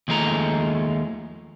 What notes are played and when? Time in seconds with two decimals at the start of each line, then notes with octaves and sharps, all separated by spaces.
0.08 D#2 F3 G#3 A3 A#5